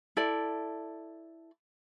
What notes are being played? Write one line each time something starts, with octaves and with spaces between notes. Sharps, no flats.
E4 A4 D5